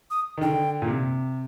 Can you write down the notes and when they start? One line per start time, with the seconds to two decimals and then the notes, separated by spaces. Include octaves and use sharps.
0.11 D#6
0.37 D#3
0.41 D3 G5
0.82 A#2
0.87 C3